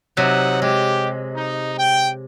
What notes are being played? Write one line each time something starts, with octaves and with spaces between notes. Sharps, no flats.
C3 F#3 D#4 F#5
G#3 G4
D#4
G5